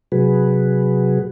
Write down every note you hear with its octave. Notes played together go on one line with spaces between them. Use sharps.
C3 F#3 F#4 G#4 B4